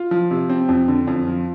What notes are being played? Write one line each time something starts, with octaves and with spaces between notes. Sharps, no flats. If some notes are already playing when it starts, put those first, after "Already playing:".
Already playing: F4
F3
C3
C4
F2
D3
F2
F3